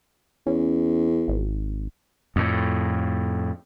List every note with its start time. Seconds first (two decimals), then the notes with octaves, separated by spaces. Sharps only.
0.47 E2 C#4
1.28 G#1
2.36 F2 A2